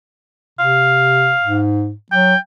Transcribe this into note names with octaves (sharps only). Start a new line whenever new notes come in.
C3 F5
G#2
F#3 G5